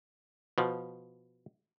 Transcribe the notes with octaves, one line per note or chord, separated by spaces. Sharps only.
B2 F3